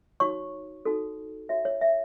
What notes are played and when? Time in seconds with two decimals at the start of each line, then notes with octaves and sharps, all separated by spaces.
0.20 D#4 F#4 C#5 C#6
0.85 D#4 F#4 A4
1.49 F#4 C#5 E5
1.65 C#5
1.81 E5